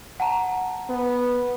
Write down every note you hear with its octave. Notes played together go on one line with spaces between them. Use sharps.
F#5 A5 A#5
B3